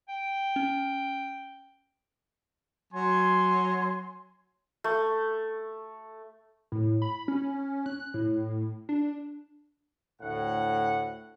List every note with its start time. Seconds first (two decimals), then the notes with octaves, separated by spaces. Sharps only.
0.09 G5
0.56 C#4
2.93 F#3 G#5 C6
4.84 A3
6.72 A2
7.02 B5
7.28 C#4
7.86 F#6
8.14 A2
8.89 D4
10.22 D2 A2 F#5